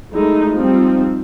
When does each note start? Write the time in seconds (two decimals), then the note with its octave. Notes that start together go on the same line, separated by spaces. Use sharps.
0.13 F#3 G#3 A3 D#4 E4
0.56 F3 G3 C4 D#4